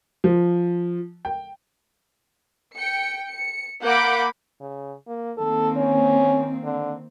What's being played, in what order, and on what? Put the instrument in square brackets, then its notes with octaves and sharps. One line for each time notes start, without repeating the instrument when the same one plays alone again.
[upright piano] F3
G5
[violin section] G5 C#7
C#7
A#3 F#5 B5 D6 G6 D7
[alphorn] C#3
A#3
[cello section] D#3 A#3 C4 [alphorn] A4
[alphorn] C#4
D3